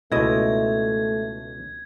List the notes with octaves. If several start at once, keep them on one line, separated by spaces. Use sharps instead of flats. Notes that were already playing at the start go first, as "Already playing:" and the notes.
C#2 B2 A3 E4 D#5 G#6